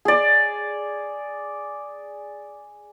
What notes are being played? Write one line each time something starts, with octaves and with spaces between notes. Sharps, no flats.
G#4 D5